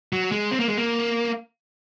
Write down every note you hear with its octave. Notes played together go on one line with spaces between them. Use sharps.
F#3
G#3
C4
A#3
G#3
A#3